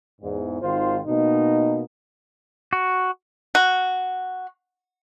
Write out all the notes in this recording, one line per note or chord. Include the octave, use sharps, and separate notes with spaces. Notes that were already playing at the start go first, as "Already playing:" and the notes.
E2 G#2
G#1 D#3 F4 C5
B2 A#3 D#4
F#4
F#4